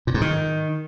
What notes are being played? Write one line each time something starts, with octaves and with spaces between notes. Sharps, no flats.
A#2
G#2
D#3